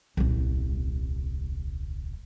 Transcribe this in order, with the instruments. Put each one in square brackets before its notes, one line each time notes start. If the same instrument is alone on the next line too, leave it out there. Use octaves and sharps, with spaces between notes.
[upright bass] D#1 C2